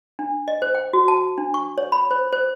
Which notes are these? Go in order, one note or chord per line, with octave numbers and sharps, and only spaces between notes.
D4
D#5
C5
G5
F#4
A5
D4
C#6
C#5
B5
C5
C5